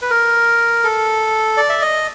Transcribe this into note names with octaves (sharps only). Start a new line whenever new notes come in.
B4
A#4
A4
D5
E5
D#5